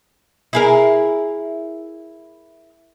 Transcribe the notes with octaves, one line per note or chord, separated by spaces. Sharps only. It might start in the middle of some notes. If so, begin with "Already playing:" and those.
E4 G#4 A#4